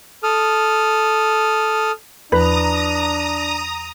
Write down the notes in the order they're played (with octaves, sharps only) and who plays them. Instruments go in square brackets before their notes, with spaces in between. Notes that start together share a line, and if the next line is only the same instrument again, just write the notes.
[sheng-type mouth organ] A4 D#6 F6
[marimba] E2 F3 [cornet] D4 [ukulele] B4 [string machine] A#5 D#6